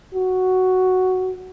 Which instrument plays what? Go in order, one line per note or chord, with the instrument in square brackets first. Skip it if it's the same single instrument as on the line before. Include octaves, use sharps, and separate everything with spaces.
[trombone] F#4